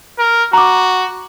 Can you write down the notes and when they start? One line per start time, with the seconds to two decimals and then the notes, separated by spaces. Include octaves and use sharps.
0.19 A#4
0.53 F#4 A#5 D6